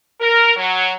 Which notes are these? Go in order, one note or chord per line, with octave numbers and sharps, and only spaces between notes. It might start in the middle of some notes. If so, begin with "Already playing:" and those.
A#4
F#3